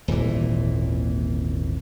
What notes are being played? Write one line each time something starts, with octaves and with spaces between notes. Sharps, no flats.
D#1 G#1 A#2 E3